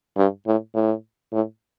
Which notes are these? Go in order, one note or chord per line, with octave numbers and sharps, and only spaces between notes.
G2
A2
A2
A2